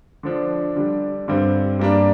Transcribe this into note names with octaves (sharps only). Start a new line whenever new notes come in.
D3 F3 D4
D3 G3 D4
G2 D3 G3 C4
G2 G3 A#3 D4